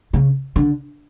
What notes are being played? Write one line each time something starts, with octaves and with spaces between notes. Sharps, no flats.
C#3
D3